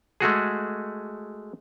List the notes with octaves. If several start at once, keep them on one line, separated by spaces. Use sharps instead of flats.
G#3 A3 F#4 G#4